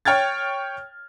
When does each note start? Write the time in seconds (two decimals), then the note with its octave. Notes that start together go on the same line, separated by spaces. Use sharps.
0.05 C#5 G5 F6 G#6 A6